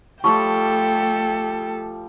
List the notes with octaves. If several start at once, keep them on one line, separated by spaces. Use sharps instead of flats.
F3 G3 A3 G4 A4 G5 C#6